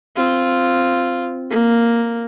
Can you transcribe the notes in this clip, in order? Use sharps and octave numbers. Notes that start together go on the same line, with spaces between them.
C4 F4
A#3